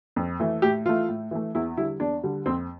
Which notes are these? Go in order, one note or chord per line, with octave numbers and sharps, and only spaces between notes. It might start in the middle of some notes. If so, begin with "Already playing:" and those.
F2
E3 A3
A2 G4
E3 A3 F4
A2
E3 A3
E2 E4
D3 G3 E4
E2 D4
D3 G3
F2 C4